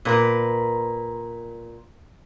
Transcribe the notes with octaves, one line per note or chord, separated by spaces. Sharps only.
A#2 A#4 B4